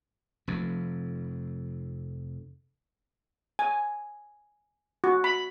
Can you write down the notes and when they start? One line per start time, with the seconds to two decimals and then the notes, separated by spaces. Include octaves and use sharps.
0.47 F1 F2
3.59 G#5
5.04 F#4
5.24 B5